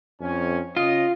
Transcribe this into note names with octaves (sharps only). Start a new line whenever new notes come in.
F2 C#4 G#5
C#3 F4 D#5